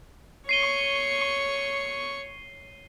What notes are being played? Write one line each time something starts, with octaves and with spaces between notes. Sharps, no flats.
C#5 C#6 C7 D#7 G7